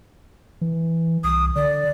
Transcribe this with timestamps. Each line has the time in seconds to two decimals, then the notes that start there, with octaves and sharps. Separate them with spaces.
0.61 E3
1.24 C2 D#6
1.56 D3 D5